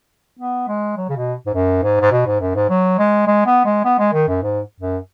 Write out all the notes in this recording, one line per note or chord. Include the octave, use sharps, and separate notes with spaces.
B3
G#3
F#3
C#3
B2
G#2
F#2
G#2
G#2
B2
G#2
F#2
G#2
F#3
G#3
G#3
B3
G#3
B3
G#3
D#3
F#2
G#2
F#2